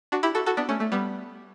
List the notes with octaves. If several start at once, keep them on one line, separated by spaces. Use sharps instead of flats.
D4 F#4
E4 G4
F#4 A4
F#4 A4
B3 D4
A3 C#4
A3
G3 B3